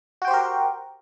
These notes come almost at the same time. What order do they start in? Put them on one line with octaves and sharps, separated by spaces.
F#4 G5 C5 G4 A#4